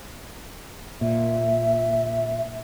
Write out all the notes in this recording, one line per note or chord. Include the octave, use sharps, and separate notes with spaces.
A#2 E5